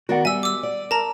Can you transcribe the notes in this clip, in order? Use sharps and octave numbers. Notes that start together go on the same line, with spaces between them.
D#3 B3 F#4 A#4 D5 F#5
G3 E5 G#5 E6
D6 E6
D5
A#4 A5 A#5